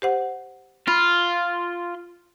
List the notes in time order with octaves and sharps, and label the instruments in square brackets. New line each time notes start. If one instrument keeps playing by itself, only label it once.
[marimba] G4 C5 F#5
[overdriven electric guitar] F4 [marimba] B5